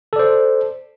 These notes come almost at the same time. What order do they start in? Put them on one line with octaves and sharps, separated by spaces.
A4 D5 C5